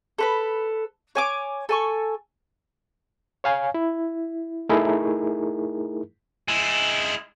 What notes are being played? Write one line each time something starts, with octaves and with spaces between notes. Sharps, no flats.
A4 B4 B5
C#5 G#5 D6
A4 G#5 C#6
C#5 F5 G#5
E4
A3 D#4 E4 G#4 A#4
G#3 E4